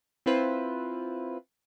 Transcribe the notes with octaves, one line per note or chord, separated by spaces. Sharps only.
C4 E4 F4 B4 C5